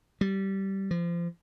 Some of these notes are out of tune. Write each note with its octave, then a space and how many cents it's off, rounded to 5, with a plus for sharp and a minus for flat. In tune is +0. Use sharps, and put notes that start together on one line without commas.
G3 -15
F3 -30